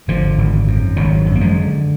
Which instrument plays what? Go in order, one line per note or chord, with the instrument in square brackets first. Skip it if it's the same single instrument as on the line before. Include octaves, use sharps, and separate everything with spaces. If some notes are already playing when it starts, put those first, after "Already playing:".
[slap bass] G#1 D3 F3
G#1
F#2
G#1 D#3 F#3
F#2
A#3
F3 G#3
D3